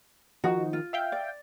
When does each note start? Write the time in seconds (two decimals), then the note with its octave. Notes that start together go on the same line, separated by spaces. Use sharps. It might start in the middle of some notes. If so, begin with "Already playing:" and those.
0.44 D#3 F3 D#4 F#4
0.73 F4
0.93 E5 F5 G5
1.12 D5